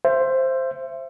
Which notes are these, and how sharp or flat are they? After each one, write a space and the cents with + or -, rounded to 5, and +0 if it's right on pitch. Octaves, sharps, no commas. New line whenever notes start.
C5 +5 E5 +30